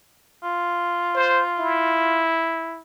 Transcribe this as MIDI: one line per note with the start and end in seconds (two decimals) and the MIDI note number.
0.43 2.22 65
1.15 1.43 72
1.59 2.81 64